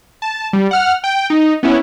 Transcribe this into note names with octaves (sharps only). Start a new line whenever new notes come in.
A5
G3
F#5 F6
G5
D#4
B3 C#4 E4